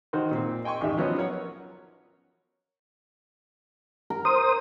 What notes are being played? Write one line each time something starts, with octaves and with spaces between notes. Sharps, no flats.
D#3 D#4 F#4 A#4 C5
A#2 C4
D#5 G5 G#5 C6 C#6
A1 D#2 D#4 G4 E5
F3 F#3 B3 C#4 C5 D#5
A#4 C#5 F#5
A#4
C5 D#6